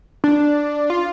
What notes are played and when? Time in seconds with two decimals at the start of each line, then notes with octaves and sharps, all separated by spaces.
0.24 D4
0.90 F4